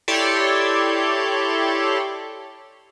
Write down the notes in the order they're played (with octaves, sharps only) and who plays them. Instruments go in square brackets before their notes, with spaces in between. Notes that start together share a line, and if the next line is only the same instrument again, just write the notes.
[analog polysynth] E4 G4 A4 C#5 D5 C6